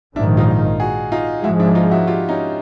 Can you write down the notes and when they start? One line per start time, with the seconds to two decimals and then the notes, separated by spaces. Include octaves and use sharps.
0.16 A#1 G#2 D#3 D4 E4
0.37 D#4 F4
0.80 F#4 G#4
1.12 D#4 F4
1.43 G#2 F3 G#3 E4 F#4
1.60 D4 E4
1.75 D#4 F4
1.91 E4 F#4
2.07 F4 G4
2.29 C#4 D#4